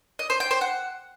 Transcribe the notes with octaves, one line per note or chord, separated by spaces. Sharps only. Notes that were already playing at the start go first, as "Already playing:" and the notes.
D#5
C5
G5
C5
F#5